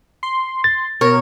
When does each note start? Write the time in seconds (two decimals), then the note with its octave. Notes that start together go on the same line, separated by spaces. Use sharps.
0.23 C6
0.64 A6
1.01 B2 A#4 C#5